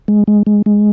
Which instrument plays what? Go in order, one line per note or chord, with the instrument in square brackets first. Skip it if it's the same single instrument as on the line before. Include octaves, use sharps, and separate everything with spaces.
[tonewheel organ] G#3
G#3
G#3
G#3